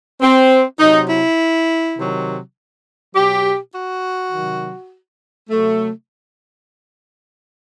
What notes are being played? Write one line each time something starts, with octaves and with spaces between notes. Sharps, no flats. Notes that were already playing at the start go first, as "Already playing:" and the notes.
C4
C3 F#3 D#4
E4
C3 D#3 F#3
B2 F#3 G4
F#4
C3 D#3 F#3
C3 F#3 A3